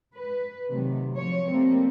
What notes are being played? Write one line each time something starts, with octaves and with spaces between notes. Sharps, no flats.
B4
C3 D#3 F#3 A3
F3 C#5
G3 A3 A#3 C4